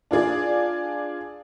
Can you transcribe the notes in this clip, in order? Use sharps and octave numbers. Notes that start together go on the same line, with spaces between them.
D4 F4 G#4 D5